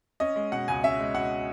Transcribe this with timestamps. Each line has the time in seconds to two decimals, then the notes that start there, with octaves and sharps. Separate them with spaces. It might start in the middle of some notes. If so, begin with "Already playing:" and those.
0.20 C#4 D#5
0.36 G#3
0.52 B2 F#5
0.68 C#2 G#5
0.83 C#4 E5
1.00 G#3
1.14 B2 F#5